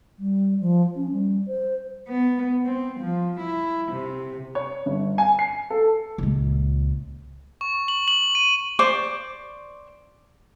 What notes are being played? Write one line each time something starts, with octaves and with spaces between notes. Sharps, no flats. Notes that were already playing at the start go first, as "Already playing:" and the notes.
G3
F3
C#4
G3
C5
B3
C4
F3
E4
C3
C#5
G1
G#5
C7
A4
C#2 A#2
C#6
F#7
F#7
D#7
C5 D5 C#6 D6